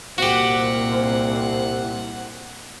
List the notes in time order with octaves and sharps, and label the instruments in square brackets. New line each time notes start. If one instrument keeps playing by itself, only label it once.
[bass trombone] C2 [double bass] A#2 C4 [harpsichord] F#4 G4 [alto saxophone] F#5